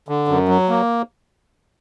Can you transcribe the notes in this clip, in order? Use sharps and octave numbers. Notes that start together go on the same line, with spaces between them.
D3
F#2
F#3
A#3